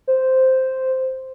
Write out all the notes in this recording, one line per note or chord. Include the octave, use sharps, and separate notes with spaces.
C5